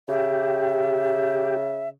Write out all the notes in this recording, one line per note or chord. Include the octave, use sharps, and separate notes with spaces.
C#3 G4 E5